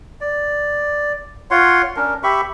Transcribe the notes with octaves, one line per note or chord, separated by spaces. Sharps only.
D5
F4 C#5 F#5 C6
C#4 D4 A#4
G4 E5 B5 C#6